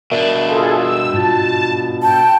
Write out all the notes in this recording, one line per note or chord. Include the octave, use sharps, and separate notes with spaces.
B2 D4 A#4 D5 E5
F4 G#4 A4
E6
G#2 F4 A5
G5 A5